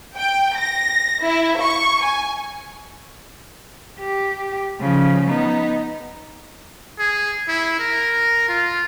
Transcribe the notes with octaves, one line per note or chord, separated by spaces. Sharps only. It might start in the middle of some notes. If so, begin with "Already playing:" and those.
G5
A#6
E4
C#6
G#5
G4
C#3 F3
B3 D#4
G#4
E4
A#4
F4